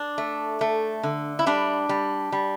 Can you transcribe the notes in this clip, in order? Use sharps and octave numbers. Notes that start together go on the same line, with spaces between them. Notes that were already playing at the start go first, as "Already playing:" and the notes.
Already playing: D4
A3
A3
D3
E4
G3 D4
G3
G3